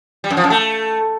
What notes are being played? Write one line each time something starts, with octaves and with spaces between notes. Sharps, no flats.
G3
F#2
F3
F#2
A3